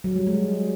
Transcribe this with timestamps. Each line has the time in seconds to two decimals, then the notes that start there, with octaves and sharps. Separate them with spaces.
0.04 F#3
0.16 G3
0.27 G#3